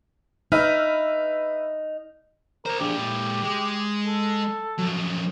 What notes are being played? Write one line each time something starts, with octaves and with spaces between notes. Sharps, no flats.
D#4 B4 E5 F6
A#4 C5 D5
D4 G4 G#4
A#2 A4
G#3
A4
F2 F#3